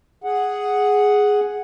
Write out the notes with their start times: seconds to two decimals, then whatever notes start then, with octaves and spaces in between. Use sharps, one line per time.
0.24 G#4 F#5